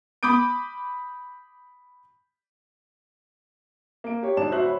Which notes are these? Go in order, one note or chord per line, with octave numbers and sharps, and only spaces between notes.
B5 D6 D#6 G6 D7
A#3 D7
G4 C#5
D1 G#2 D5 A5 E7
D1 F#4 C5 E5 F#6 F#7
C#5 B5